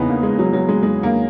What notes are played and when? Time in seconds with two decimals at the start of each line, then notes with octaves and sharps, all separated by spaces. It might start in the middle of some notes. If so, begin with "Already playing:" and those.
Already playing: E2 C#3 E3 B3 D#4
0.08 A#3
0.23 G#3
0.39 F#3
0.53 F#3
0.69 G#3
0.83 G#3
1.03 A#3